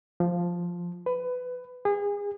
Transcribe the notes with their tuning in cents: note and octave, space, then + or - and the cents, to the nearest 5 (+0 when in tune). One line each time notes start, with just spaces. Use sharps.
F3 +0
B4 +20
G#4 -30